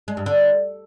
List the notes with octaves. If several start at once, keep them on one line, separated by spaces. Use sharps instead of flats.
G#3
G2
D3